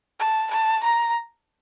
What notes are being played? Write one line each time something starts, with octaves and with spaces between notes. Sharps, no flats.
A5
A5
A#5